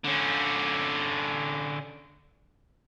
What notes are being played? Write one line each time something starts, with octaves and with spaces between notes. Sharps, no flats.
D3 C#4